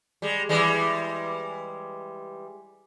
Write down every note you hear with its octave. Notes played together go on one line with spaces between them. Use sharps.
G3 G#3
E3 G3 G#3